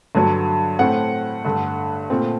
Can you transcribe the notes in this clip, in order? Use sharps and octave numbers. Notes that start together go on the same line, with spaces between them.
G2 D3 F#3
A2 A3 C4 F#5
G2 D3 A3
A#2 A3 C4